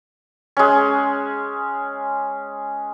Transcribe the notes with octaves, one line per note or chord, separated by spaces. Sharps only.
G#3 C#4